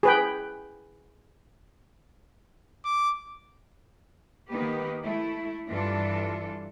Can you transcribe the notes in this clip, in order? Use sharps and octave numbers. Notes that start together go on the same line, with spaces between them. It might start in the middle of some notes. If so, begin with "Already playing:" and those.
G#4 B4 G5
D6
D#3 A#3 B3 D#4 G4 B4
A3 E4
G2 E3 D4 F4 A4